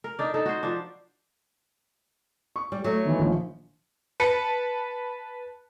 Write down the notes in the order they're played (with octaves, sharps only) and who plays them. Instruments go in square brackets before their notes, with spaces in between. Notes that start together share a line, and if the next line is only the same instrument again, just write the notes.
[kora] A#4
D4 D#4 D5
D#4 A4
F#4 C5
F3 D4
[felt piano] C#6
[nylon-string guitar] G3
F#3 A3
[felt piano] D#3 E3
A#1 D#3 F3
[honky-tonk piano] B4 A5 C#7